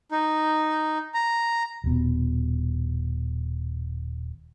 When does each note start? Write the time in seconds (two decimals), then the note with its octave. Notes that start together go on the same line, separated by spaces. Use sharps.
0.11 D#4
1.14 A#5
1.84 D#1 B2